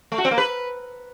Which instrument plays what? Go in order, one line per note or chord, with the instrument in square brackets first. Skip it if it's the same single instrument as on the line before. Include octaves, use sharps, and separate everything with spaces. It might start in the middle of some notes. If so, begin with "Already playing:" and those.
[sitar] A3
F#4
C4
A#3
B4